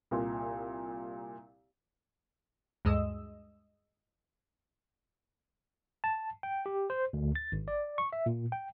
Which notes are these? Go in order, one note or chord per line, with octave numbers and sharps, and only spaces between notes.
C2 A#2
D2 G2 G#3 D#5 E6
A5
G5
G4
C5
D2
A6
G#1
D5
C#6
E5
A#2
G5